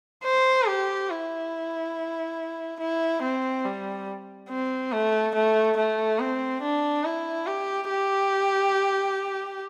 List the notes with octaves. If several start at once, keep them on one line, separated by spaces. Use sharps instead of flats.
C5
G4
E4
E4
C4
G3
C4
A3
A3
A3
C4
D4
E4
G4
G4